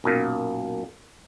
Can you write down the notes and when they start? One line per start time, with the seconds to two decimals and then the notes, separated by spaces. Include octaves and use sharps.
0.04 B1 F#2 A#2